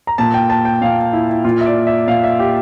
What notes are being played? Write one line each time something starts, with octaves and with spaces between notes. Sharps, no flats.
A#5
A#2 A5
G5
A5
G5
A#2 F5
E4
E4
A#2 F4
E5
D5
E5
A#2 F5
E5
G4